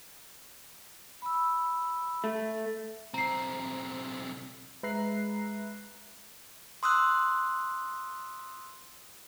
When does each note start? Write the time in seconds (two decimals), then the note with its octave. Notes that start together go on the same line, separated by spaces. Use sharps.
1.22 B5 E6
2.24 A3
3.14 B1 C4 A#5 C7
4.83 G#3 B4 E5 A#5 F#6 C7
6.83 C6 D#6 E6 F#6